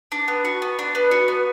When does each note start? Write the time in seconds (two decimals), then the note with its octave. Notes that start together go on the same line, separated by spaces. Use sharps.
0.12 D4
0.28 B3
0.45 F#4
0.62 B3
0.79 D4
0.95 B3
1.11 F#4
1.28 B3